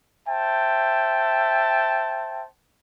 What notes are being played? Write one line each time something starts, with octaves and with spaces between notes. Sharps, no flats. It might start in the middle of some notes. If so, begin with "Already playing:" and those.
C5 E5 G5 A5